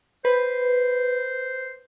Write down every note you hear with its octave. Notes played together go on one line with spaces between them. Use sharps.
B4 C5